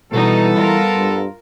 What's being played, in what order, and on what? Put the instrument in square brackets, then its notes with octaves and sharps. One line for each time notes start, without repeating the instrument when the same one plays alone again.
[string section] B2 D#4 [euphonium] E3 [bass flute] G3 [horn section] B3 A4
[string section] F4 A#4
[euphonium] G2